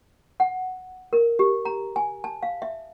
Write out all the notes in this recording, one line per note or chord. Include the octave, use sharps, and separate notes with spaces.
F#5
A#4
G4
A#5
G#5
A5
F5
E5